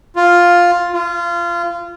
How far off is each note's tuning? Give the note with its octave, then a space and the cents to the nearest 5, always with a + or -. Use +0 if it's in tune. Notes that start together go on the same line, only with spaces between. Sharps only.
F4 +5
F4 -25